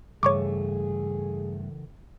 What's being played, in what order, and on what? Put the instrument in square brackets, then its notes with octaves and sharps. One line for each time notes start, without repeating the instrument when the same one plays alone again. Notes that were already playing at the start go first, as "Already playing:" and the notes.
[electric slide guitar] G2 A3 [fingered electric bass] C#3 E3 [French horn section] G#4 [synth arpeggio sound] C#5 C#6 D6